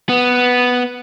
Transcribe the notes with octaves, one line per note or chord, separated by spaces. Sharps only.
B3